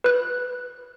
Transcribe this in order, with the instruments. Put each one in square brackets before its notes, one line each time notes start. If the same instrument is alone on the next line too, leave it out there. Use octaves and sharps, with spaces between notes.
[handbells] B4 F#6